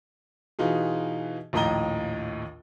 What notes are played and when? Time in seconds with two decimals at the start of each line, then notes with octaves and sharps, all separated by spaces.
0.59 B2 E3 D#4 F4 G#4
1.53 A#1 D#2 A2 D#5 A#5 G7